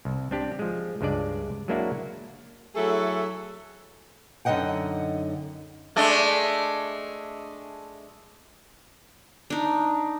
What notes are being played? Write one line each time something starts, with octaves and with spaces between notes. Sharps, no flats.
C2
C4 D4 G4
F3 G#3
C#2 G2 G#3 D4 D5
F#3 G#3 A#3 D4 E4 F#4
F#3 A3 E4 G#4 A4
F#2 D3 D#4 D#5 F#5 G5
G#3 A3 D4
D4 D#4